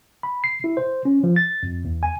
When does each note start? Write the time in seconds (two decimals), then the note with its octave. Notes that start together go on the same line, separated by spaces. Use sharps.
0.23 B5
0.44 C7
0.64 E4
0.77 C5
1.05 C#4
1.24 F3
1.36 A6
1.63 F2
1.85 E2
2.03 G#5